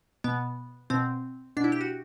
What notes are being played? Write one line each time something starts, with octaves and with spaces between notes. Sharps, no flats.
B2 B3
B2 C4
B2 D4
E4
G4
F#4